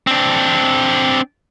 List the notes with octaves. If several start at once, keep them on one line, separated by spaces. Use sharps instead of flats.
C4 D4